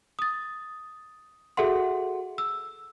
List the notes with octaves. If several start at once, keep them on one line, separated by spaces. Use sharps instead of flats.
D#6 A6
F#4 G#4 A4 E5 F#5 C6
E6